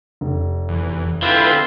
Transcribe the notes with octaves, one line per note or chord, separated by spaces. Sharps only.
F1
E2
D3 C4 E4 F4 B4